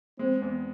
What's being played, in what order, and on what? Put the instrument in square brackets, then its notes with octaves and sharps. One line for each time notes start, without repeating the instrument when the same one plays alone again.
[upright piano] G#3 [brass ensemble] C4
[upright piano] E2